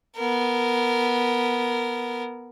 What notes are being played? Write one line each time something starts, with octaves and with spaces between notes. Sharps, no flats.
B3 A#4